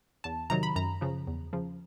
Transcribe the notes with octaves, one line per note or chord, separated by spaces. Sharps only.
E2 A5
C3 D#3 F#3 A#5
B5
F#2 A#5
C#3 F3
E2
C#3 F3